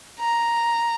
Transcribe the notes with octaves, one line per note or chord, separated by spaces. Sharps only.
A#5